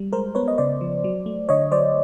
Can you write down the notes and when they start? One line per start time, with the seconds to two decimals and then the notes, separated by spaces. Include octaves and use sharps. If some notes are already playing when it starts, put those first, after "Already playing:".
Already playing: G3
0.13 G#3 A#4 C5
0.35 B3 B4 C#5
0.48 D#5
0.58 C#3 C5 D5
0.81 F3
1.04 F#3
1.26 A3
1.49 D3 C#5 D#5
1.72 F#3 C5 D5